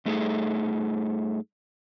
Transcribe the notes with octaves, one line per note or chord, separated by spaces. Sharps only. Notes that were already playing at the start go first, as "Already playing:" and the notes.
G2 A3 D#4 G#4 A4